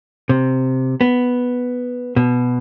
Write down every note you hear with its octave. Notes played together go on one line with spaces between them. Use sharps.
C3
B3
B2